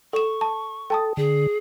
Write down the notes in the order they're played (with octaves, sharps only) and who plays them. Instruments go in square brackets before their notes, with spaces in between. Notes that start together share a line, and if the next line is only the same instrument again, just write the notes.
[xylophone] A4 E7 [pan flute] C#6
[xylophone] A5
[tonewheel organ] A4 [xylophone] G5 A5 D#6
[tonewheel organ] D3 [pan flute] G#4